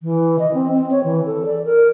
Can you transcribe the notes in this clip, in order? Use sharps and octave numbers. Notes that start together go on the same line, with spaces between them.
E3
D#5
C4
C4
C#5
E3
A4
D5
A#4